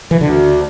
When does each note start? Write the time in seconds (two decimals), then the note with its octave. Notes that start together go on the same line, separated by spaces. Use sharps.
0.11 E3
0.21 D2 D3